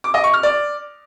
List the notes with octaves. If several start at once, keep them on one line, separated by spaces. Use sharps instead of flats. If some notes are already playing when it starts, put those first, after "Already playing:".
D6
D#5
C#6
F6
D5